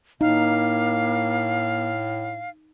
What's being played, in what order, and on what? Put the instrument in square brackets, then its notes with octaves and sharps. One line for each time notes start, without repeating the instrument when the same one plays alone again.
[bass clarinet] A2 [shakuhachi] A#3 [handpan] D#4 [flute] F5